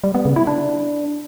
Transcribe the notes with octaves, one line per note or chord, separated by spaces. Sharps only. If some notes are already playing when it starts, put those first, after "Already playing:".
G3
B3
C#3
E4
D4